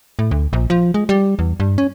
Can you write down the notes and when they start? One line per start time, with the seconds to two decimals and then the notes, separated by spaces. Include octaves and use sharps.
0.19 A2
0.31 D2
0.53 A#1
0.70 F3
0.94 G#3
1.09 G3
1.39 E2
1.60 G2
1.78 C#4